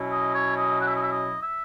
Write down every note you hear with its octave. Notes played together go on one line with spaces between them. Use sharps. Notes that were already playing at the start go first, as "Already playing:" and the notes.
Already playing: B2 F#3 C#4 E4
D#5
C#5
D#5
F#5
E5
D#5
E5
D#5
E5